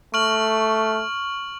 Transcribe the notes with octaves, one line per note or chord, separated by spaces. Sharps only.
A3 C#6 F6 F#7